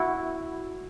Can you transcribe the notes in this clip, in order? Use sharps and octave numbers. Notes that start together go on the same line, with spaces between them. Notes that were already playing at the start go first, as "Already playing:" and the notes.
Already playing: E4 F#4